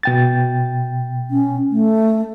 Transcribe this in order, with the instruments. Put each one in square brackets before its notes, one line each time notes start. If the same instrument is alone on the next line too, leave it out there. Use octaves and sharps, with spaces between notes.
[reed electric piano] B2 G5 A6
[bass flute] C#4
A3